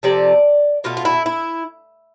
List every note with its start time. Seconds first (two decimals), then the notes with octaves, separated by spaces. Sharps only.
0.03 C3 F3 A3 D5
0.84 B2 A3 F4
0.97 F4
1.05 E4
1.26 E4